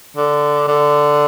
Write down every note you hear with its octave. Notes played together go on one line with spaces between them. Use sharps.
D3
D3